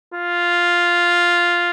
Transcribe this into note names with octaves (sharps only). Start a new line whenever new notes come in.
F4